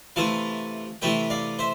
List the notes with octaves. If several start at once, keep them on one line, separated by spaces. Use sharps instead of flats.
C3 E3 A3 E4 F5 A5
C3 E3 A3 E4 E5 G5
D5 F5
C5 E5